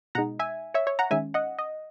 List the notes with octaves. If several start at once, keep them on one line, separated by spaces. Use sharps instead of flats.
B2 G#3 D#4 F#5 A#5
E5 G#5
C#5 E5
C#5
F#5 A#5
D#3 G#3 C#4 E5 G#5
D#5 F#5
D#5